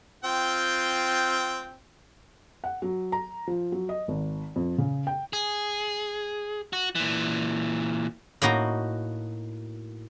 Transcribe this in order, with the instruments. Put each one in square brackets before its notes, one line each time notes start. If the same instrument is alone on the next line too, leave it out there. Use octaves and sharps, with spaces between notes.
[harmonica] C4 F4 G5
[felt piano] F#5
F#3
A#5
F3
F#3
D#5
G#1
F2
C#3
G5
[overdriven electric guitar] G#4
F#4
A#2 E3
[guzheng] A2 A#3 D#4 F#4 A#5